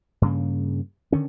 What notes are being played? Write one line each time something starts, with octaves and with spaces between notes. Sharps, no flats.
G2 C#3 A#3
D3 D#3 C#4